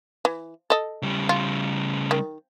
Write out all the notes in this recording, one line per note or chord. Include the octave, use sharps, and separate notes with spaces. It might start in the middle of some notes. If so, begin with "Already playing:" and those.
E3
A4 D#5
C#3 G3
F4
D#3